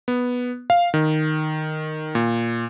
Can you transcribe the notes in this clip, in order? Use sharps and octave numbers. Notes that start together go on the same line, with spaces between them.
B3
F5
D#3
A#2